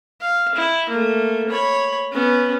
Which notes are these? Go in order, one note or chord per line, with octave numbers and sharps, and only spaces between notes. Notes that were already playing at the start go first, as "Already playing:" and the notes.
F5
E4
A3 A#3
C#5 B5
B3 C#4